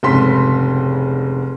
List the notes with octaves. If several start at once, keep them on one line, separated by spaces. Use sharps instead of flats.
F1 G#2 C#3 C4 C6 B6